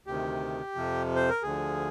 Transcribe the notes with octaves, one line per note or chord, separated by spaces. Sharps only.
D2 C3 D#3 G4
F2 C3 F3
C5
A#4
D2 D3 F3 G#4